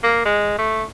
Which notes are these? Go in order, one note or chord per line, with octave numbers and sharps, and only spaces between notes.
A#3
G#3
A3